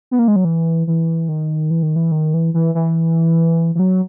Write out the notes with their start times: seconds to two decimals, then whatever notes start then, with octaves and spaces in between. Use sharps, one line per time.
0.11 B3
0.19 A#3
0.28 G#3
0.36 F#3
0.45 E3
0.87 E3
1.29 D#3
1.70 E3
1.83 D#3
1.96 E3
2.12 D#3
2.34 E3
2.54 E3
2.75 E3
3.75 E3
3.79 F#3